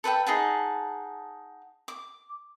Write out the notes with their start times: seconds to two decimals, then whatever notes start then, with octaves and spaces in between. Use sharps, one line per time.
0.04 A4 B4 E5 G5
0.27 D#4 G#4 F#5 A5
1.88 D6